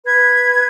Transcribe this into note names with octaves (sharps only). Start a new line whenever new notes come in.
B4 G#6